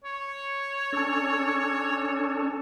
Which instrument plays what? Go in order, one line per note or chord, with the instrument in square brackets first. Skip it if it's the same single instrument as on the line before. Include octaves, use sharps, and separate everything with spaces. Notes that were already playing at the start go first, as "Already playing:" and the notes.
[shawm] C#5
[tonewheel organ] C#4 D4 A4